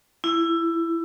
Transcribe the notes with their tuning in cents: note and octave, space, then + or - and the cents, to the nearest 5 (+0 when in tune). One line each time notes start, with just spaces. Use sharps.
E4 +15